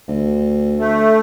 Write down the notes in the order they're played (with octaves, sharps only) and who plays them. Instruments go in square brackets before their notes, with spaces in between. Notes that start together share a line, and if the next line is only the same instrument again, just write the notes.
[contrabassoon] D2
[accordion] A3